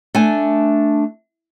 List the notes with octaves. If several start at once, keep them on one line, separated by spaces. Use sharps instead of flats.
A3 D4 G#5